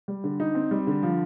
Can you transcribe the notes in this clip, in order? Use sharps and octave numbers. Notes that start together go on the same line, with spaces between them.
G3
D3
D#4
C4
G3
D3
F3